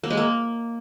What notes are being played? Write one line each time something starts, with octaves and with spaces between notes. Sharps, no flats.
A#3
G#3
A#3